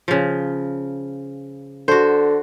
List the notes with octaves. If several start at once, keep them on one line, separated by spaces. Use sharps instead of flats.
C#3 F3
D3 F#4 C5